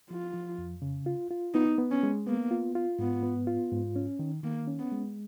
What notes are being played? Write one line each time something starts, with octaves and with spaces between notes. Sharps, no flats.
F3 F4
F3
F2
C#3
F4
F4
B3 D#4
B3
C#4
G#3
A#3 B3
F4
F4
G#2 B3
B3
F4
G#2
C#4
D#3
D#3 A#3
C#4
B3
G#3